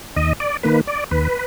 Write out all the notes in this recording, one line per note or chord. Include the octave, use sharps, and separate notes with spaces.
D#2 D#5
D5
D#3 A#3 B4
D5
D#2 B4